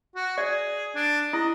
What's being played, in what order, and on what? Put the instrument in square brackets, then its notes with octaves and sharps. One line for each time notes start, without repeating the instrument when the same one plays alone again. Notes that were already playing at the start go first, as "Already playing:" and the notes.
[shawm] F#4
[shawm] G#4 [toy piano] D5
[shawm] D4
[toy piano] E4 [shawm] D#5